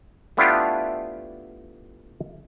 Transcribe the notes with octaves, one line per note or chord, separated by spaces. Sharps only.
A3 B3 D4 E4 F4 G4